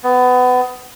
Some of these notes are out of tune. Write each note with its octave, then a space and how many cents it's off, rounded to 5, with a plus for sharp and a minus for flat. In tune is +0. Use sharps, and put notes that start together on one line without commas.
B3 +25